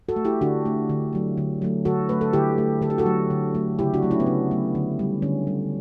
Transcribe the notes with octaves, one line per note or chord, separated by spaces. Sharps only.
F#4 A4
A3
E4 G4
D3 D4 F#4
A3
D3
F#3 A3
D3
F#3 A3
D3 F#4 A4
A3 B4
A4
D3 E4 G4
A3
D3 A4
G4
F#4 A4
F#3 A3
D3
F#3 A3
C#3 E4 G4
D4 F#4
F#3 A3
C#4 E4
B3
C#3 C#4
F#3 A3
D3
G3
D3 C#4
G3